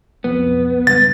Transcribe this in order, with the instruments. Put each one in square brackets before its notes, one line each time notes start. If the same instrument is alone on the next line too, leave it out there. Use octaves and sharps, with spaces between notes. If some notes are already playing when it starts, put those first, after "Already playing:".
[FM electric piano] B1 F2 [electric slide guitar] B3
[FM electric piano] C#2 G2 [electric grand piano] A6